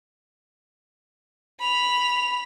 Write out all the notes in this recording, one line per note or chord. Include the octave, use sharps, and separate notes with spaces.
B5 F7